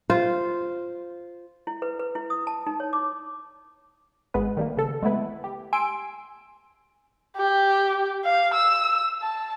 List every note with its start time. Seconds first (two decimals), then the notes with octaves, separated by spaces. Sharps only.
0.10 F4 C5
1.67 E4
1.82 B4
2.00 B4
2.15 E4
2.30 D#6
2.47 A5
2.67 D#4
2.80 C#5
2.93 D6
4.34 G#1 G#3 B3 B4
4.57 D#3 G3 A3 A#3
4.77 C#3 A4
5.03 G#3 A3 B3 E4 B4
5.44 G4
5.73 G#5 C6 E6 D7
7.37 G4
8.25 F5
8.54 E6
9.22 A5